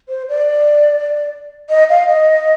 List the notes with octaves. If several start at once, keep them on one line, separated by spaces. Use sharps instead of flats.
C5
D5
D#5
F5
D#5